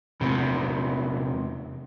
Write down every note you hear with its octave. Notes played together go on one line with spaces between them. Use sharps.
E2 C3